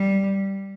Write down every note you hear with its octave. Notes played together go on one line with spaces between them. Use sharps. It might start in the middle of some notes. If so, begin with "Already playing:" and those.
Already playing: G3